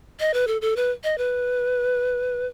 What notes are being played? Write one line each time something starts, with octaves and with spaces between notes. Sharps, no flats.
D#5
B4
A4
A4
B4
D#5
B4